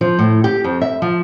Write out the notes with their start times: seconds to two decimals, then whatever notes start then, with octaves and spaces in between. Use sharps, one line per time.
0.01 F3
0.19 A2
0.44 G4
0.64 F2
0.81 E5
1.02 F3